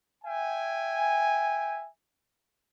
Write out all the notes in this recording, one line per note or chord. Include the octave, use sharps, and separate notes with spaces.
E5 G5 G#5